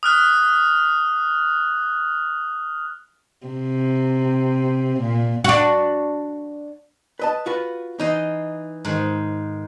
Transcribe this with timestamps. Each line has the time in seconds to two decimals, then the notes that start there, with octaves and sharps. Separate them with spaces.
0.03 D#6 F6 F#6
3.47 C3
4.99 A#2
5.44 D4 F#4
7.19 B4 D#5 A5
7.46 F4 F#4 B4
7.99 E3 D#4 D#5 C6
8.85 G#2 D#3